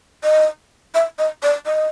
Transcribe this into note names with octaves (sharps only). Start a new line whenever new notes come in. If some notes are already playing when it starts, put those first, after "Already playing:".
D#5
E5
D#5
D5
D#5